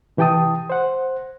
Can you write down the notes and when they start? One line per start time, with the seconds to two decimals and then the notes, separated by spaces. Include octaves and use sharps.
0.17 C3 E3 G4 G5 A5 D#6
0.70 C5 F#5